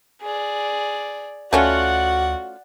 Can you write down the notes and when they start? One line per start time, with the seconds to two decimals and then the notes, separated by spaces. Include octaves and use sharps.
0.22 G#4 D5
1.53 D2 A3 C#4 F4 F#4 D5 F#5